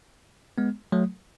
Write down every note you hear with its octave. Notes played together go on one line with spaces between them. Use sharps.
G#3 B3
F#3 A3